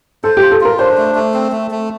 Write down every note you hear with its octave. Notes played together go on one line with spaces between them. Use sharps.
A4 C5
G4
F4
A4
F4 A#4
D4 C5
A3
A3
C4
A3
A3